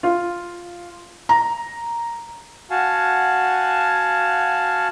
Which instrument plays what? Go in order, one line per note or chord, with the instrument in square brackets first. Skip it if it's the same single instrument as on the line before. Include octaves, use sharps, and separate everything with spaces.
[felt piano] F4
A#5
[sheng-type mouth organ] F#4 F5 F#5 G#5 A5